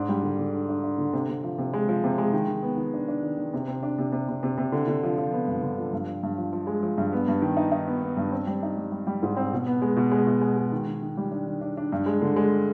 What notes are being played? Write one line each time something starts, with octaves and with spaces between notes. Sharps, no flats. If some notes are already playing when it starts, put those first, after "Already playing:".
Already playing: G#2 D4
G3
D3
D3
D4
D4
D4
D3
C3
C3
F3
C3
G#3
F3
C3
G#3
D#3
D#3
B3
D#3
D4
D4
D#3
D#3
C3
C3
D4
C3
C3
C3
C3
C3
D3
D3
F3
F3
B3
G2
D3
F3
G2
F3
G2
F3
F3
G#3
F3
G2
B3
G2
D#3
D#4
D#4
B3
B3
G2
C4
G3
D#4
G3
G3
G3
G#2
C4
B2
B3
G#3
B2
G#3
B2
G#3
G#3
D#3
D#3
D#3
G3
D4
D#3
D4
D4
G2
G#3
D3
G#3